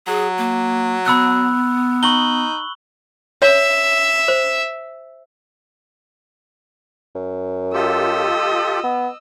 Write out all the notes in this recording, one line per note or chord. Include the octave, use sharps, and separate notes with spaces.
F#3 G#4
A#3
B3 B5 E6 F#6
D#4 C#6 F#7 G7
C#5 E5
C5
F#2
F4 G4 A4 D#5 E6
B3